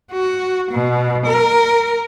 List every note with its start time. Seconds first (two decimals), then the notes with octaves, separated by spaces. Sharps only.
0.11 F#4
0.72 B2
1.26 A#4